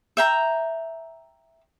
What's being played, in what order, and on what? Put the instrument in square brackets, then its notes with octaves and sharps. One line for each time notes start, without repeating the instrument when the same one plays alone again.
[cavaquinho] E5 G5 A#5